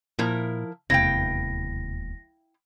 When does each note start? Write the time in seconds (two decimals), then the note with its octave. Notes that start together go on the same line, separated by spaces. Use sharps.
0.19 A#2 F3 E4 A#4
0.90 E1 D#2 C3 E4 F5 G5 A#6